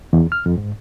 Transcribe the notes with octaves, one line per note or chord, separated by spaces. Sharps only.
E2
F6
F2
G#2